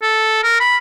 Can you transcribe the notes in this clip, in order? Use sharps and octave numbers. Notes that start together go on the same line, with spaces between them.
A4
A#4
B5